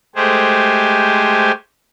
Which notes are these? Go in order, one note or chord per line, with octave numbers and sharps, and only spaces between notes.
G#3 A3 G4 G#4 C5